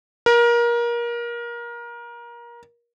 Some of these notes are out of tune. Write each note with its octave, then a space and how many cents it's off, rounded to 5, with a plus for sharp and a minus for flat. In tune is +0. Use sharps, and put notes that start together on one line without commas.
A#4 +25